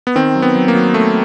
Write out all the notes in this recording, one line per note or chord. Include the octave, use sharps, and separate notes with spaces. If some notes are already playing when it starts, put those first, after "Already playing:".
B3
D#3 C4
F#3
B3
F#3
A#3
F#3
F#3 A3